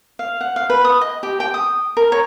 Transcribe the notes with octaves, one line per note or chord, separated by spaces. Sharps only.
F5
F#5
F5
B4
D#6
D#5
G4
G5
D#6
A#4
C#5